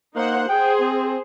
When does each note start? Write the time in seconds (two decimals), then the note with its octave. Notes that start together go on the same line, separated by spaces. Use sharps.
0.16 A#3 D#4 C5 F#5
0.49 G#4 C5 G5
0.80 C4